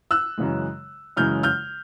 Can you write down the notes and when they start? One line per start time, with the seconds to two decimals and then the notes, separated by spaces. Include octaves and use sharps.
0.11 E6 F#6
0.38 F#2 C#3 E3 G#3
1.17 F#2 C#3 E3 G#3 F6 G6
1.43 F6 G6